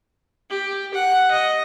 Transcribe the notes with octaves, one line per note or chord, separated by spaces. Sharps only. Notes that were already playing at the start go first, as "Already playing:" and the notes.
G4
F#5
D#5